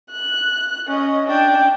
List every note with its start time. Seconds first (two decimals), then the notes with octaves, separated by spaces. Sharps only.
0.11 F#6
0.87 C#4 D#5
1.28 D4 G5